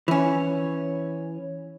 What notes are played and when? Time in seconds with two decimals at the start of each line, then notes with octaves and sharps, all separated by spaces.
0.08 E3 C#4